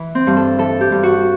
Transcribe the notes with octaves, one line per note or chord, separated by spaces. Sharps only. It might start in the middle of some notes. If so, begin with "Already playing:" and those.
Already playing: E3
C4
G2
A4
E3 A4
G4
G2
F#4